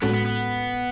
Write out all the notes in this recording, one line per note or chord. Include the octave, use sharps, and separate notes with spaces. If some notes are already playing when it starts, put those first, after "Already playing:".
A2 G#3 B3 C#4 F#4 A4
B3
B3